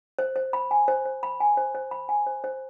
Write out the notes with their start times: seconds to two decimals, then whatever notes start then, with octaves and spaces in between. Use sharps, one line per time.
0.19 C5
0.36 C5
0.53 B5
0.71 G#5
0.88 C5
1.05 C5
1.23 B5
1.40 G#5
1.57 C5
1.75 C5
1.91 B5
2.09 G#5
2.27 C5
2.44 C5